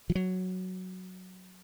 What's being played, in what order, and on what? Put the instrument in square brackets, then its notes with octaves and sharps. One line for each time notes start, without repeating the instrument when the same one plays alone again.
[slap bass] F3
F#3